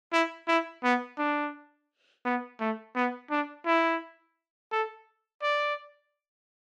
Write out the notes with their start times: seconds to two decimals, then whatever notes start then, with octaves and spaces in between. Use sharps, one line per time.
0.13 E4
0.48 E4
0.84 B3
1.19 D4
2.25 B3
2.60 A3
2.96 B3
3.31 D4
3.66 E4
4.72 A4
5.43 D5